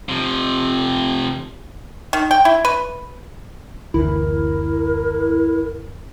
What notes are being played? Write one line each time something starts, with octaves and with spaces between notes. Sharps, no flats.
C3 F3
D#3
G5
E4
B4
F#1 D2 E3 E4 A#4